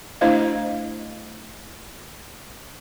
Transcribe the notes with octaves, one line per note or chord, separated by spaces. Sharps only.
A3 D4 E4 C5 D#5 F5